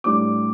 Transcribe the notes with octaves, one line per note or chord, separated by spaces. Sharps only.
A2 G3 D4 D6